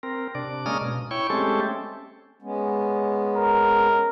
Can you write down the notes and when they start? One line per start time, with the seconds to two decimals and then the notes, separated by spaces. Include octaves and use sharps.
0.03 C4 A#4
0.35 C3 D4 D5
0.66 G#3 A#3 C#4 D#6 F6
0.81 B2
1.11 E4 C#5 G5 C#6
1.30 G#3 A3 C4 C#4 G4 A4
2.42 G#3 B3 C#4
3.36 A#4